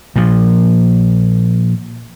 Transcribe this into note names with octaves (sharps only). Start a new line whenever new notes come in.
A#2 F3